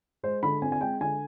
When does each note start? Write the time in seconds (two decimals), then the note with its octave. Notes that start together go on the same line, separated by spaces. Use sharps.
0.23 G#3 C5
0.43 D3 B5
0.62 C4 G#5
0.72 G#5
0.81 G#3 G5
1.01 D3 G#5